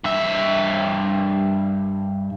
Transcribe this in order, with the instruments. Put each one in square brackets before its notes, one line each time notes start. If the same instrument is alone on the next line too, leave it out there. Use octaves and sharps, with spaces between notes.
[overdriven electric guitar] G2 E5